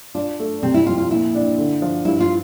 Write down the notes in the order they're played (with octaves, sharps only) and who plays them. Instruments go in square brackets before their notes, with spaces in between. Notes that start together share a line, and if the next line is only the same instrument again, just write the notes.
[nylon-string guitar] D4 [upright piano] F4
[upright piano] A3
[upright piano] C3 [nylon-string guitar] C4
[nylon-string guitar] E4
[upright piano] F2 [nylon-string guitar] F4
[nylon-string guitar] F4
[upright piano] A#2 [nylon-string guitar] E4
[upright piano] D4
D3
F3
[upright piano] G2 [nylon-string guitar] E4
[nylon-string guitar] F4